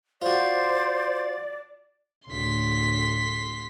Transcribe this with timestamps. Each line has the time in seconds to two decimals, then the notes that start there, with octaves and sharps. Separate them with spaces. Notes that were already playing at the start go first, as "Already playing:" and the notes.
0.22 F4 F#4 C5 D5
2.28 D2 A2 C6 B6